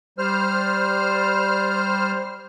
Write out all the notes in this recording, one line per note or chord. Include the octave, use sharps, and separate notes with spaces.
G3 C5 F6